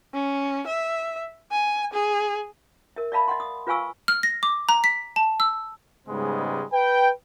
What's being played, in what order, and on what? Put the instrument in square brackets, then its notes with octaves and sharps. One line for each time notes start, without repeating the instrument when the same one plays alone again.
[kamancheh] C#4
E5
G#5
G#4
[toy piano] A#4 E5
D5 E5 F5 A5 B5
D#5 E5 F#5 C6
D#6
F4 B4 F5 G#5 C#6 E6
[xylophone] F6
A#6
D6
A#5
B6
A5
E6
[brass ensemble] G#2 C#3 G3 G#3 B3
B4 G5